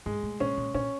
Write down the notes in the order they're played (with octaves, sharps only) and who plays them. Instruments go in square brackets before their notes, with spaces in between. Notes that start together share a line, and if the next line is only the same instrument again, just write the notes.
[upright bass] G#2 [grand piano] G#3
[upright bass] A2
[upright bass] A#2 [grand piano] C#4
[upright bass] A#2
[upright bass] A#2 [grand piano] C#4